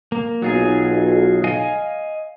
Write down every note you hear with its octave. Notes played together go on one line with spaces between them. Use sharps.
A#3
B1 F#3 F4 G#4
D#5 F5 G#5